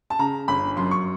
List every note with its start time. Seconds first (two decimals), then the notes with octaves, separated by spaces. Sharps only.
0.10 A5
0.19 C#3 A#5
0.48 G1 B5
0.77 F#2 C6
0.91 C#6